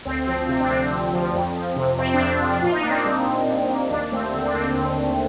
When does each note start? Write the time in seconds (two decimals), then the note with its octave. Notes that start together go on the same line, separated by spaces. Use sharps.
0.05 D2 C4
0.27 F3 C4
0.48 C3 C4
0.60 D4
0.70 D2 C4
0.92 D2
1.13 F3
1.34 F2
1.55 F3
1.76 C3
1.98 F2 C4
2.14 D4
2.20 F2
2.41 F3
2.46 D4
2.62 A#2 F4
2.72 D#4
2.81 A#3 D4
2.90 C4 D#4
3.05 G3
3.26 A#2
3.48 A#2
3.69 A#3
3.91 D#2 D4
4.12 A3 C4
4.33 D3 C4
4.45 D4
4.55 D#2 C4
4.76 D#2
4.98 A3